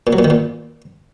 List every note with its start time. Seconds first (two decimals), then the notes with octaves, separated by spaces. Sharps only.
0.07 A#2
0.13 F#3
0.19 A#2
0.24 D#3
0.30 A#2